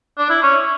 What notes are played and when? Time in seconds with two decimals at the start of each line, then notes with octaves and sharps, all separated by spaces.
0.18 D4
0.30 E4
0.43 C#4